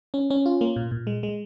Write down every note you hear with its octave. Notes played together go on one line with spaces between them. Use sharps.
C#4
C#4
F4
A#3
A#2
A#2
G#3
G#3